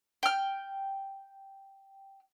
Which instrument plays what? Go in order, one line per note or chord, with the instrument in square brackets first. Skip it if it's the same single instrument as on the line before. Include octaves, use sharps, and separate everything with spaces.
[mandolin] G5 F6